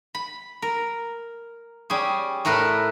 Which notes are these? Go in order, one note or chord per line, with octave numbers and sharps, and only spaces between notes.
B5
A#4
G3 C#4 G#4
A2 A3 A#4 B4